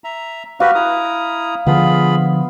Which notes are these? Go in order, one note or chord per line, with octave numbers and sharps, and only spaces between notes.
E5 A#5
F#4 G4 B4 F5
E4 A#5 D#6
D3 F3 B3 F4 G#4 B5